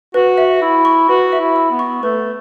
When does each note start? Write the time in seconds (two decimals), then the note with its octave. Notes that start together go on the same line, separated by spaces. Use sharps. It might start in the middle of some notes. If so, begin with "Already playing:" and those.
0.14 F#4 B4
0.38 E5
0.62 E4 E6
0.85 C#6
1.09 F#4 B4
1.32 E5
1.40 E4
1.56 E6
1.71 B3
1.79 C#6
2.02 A3 B4